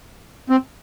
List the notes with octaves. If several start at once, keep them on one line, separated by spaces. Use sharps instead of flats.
C4